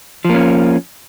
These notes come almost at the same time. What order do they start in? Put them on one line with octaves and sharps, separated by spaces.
F3 A#3 C#4